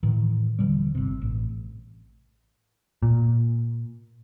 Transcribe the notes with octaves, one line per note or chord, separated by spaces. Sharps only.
A2 D#3 E3
D#1 D3 E3 G3
G1 C3
A1
A#2